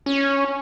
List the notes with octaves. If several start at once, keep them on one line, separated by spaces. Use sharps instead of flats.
C#4